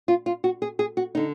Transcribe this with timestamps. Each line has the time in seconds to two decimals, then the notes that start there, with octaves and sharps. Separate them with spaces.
0.08 F4
0.26 F4
0.44 F#4
0.62 G#4
0.79 G#4
0.97 F#4
1.15 D3 D#4